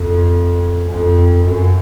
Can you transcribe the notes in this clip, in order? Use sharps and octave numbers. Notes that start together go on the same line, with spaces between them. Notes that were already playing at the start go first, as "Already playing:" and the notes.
Already playing: F2
F2
F#2